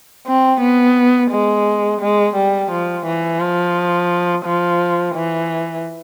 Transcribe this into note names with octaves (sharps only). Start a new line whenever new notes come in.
C4
B3
G#3
G#3
G3
F3
E3
F3
F3
E3